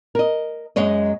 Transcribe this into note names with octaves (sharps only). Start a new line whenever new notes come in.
A#4 D#5
F#2 G#3 C#5 D#5